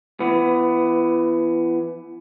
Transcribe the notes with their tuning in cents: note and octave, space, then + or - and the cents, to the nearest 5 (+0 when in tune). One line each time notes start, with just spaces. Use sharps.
E3 +35 B3 +15